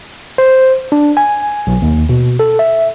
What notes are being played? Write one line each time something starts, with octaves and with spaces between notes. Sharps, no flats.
C5
D4
G#5
B1
D#2
B2
A4
E5